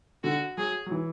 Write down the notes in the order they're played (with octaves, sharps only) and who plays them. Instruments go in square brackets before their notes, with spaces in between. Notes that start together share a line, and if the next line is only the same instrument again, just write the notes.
[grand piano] D3 [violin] F#4
[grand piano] F#3 [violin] G#4
[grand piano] F#3
E3